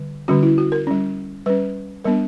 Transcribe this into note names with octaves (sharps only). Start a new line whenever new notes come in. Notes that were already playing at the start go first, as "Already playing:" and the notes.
Already playing: D3 G3
D3 G3 C#4 F#4
E4
F#4
A#4
G3 C#4
G3 C#4 B4
G3 B3 D4 A#4